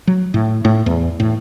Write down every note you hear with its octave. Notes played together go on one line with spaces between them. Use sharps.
F#3
A2
A2
E2
A2